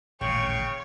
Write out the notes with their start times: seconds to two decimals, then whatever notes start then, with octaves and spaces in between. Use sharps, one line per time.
0.21 D#1 A1 A#2 C#3 C#5 G5 C#6